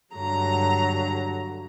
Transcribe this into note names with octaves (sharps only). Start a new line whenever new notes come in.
G2 D3 F#3 A#5